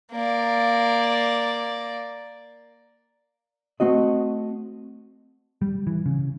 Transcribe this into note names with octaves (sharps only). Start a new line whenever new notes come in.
A#3 D5
A3 C4 F#4 D#5
G3
E3
C#3